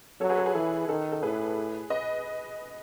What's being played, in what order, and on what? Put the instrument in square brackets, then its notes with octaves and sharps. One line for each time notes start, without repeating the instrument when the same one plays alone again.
[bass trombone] F#3 [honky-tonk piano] A4 C#5
[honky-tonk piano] G#4 B4
A4
G#4 B4
[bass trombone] E3 [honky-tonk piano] A4
[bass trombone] D#3 [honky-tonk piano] A4
[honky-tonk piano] A4
[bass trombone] A2 [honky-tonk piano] G#4 B4
[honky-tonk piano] B4 D#5